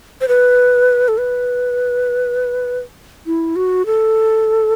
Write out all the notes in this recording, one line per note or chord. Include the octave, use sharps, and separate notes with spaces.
C5
B4
A4
B4
E4
F#4
A4